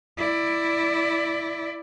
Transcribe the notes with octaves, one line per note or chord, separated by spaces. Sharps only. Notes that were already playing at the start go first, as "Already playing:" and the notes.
E4 D5